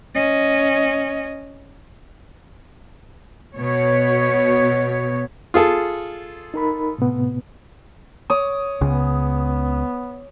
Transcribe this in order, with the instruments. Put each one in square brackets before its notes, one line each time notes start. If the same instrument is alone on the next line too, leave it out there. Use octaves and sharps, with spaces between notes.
[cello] C#4 D#5
[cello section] B2 C#5
[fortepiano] F4 G#4 A4
[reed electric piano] D#4 A#4 B5
A2 C3 B3
[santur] C#5 D6 D#6
[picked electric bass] C#2 C#3 [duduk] B3